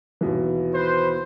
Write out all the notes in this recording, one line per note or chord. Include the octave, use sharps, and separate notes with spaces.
D#2 B2 E3
B4 C5